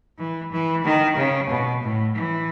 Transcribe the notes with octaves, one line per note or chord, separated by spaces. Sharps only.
E3
E3
D#3
C#3
B2
A2
E3